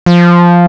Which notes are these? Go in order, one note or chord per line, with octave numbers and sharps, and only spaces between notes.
F3